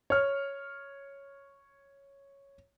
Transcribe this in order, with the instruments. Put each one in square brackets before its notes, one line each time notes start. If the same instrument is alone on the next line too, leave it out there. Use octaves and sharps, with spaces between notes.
[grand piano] C#5 F6